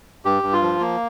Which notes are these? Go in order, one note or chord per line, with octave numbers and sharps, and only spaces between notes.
G2 G4
G2
F4
F3
A#3